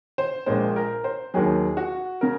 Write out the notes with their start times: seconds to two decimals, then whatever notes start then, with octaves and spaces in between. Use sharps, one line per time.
0.18 C5
0.46 A#1 A#2 G#3 C5
0.76 A#4
1.04 C5
1.34 D#2 D#3 F#3 G#4
1.77 F#4
2.21 C#3 A#4